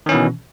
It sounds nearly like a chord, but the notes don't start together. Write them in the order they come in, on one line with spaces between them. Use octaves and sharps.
D#3 C#4 E3 B2